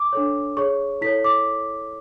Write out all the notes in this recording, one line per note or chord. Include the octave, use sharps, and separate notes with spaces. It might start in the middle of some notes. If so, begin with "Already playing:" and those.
Already playing: D6
D4 A4 C#5
G#4 C#5 C#6
E4 A4 C#5 B6
D6